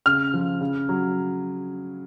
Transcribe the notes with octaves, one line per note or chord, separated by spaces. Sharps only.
C#3 F6
F3
C#3
F#3